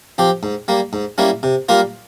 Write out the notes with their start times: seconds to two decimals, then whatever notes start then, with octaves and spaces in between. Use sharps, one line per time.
0.18 F3 C4 G4
0.43 G#2
0.68 G3 A#3
0.93 G#2
1.18 G3 A#3 C#4 E4
1.43 C3
1.69 G3 A#3 F4 A#4